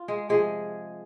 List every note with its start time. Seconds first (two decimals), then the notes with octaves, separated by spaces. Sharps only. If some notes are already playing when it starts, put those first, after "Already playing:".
Already playing: F4
0.08 G#3 G#4
0.29 C3 F3 G#3 G#4